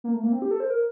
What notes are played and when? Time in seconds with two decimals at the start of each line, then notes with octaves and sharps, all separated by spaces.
0.04 A#3
0.14 A3
0.23 A#3
0.32 C4
0.42 G4
0.51 A4
0.60 C5
0.70 A#4